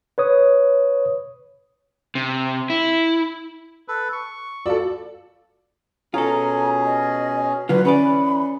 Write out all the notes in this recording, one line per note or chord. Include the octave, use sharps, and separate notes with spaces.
B4 C#5 D#6
C3
E4
A4 B4
C#6
F4 F#4 A4 D5 F5 E6
B2 C#4 F4 G#4 A4 A#5
D#5
D3 F#3 F4 F#4 B4
E3 C#4 G#4 D5 B5